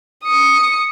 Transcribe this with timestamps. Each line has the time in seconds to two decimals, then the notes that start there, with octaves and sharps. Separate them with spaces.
0.24 D#6 C#7